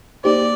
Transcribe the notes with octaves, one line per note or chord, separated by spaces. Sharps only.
A#3 D#4 G4 C5 D5